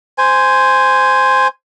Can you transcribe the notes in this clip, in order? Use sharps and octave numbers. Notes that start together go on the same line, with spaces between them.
C5 G#5